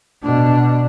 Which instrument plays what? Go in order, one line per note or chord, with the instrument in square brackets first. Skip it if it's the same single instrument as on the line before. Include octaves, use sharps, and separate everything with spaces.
[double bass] B2 D4